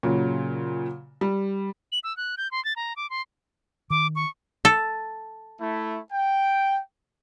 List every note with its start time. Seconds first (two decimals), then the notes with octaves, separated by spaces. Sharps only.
0.03 A#2 C#3 F#3
1.21 G3
1.92 F#7
2.04 E6
2.17 F#6
2.38 G6
2.51 C6
2.65 A6
2.76 A#5
2.96 D6
3.10 C6
3.90 D#3 D6
4.16 C#6
4.65 A4
5.60 A3 E4
6.12 G5